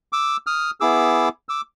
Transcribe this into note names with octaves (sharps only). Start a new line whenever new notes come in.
D6 E6
D#6 F6
B3 E4 G#4 D6 E6
D6 E6